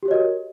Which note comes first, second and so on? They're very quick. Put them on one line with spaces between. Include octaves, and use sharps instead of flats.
G4 F#4 C#5 D#5 A#4